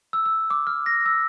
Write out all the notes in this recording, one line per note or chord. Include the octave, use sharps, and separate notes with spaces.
E6
E6
D6
F6
A#6
E6